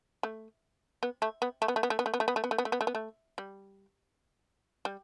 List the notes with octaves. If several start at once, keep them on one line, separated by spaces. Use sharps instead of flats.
A3
B3
A3
B3
A3
B3
A3
B3
A3
B3
A3
B3
A3
B3
A3
B3
A3
B3
A3
B3
A3
B3
A3
G3
G3